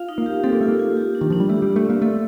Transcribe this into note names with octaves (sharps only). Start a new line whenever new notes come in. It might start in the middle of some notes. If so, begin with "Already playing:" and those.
Already playing: F4 F5
D#4
A#3
G4
C4 A4
A#3
A3 F4
A#3
F4
G4
D4
D#3
F3 D4
G3
A3 G4
G3 D5
A3
A#3 C4
A3 A4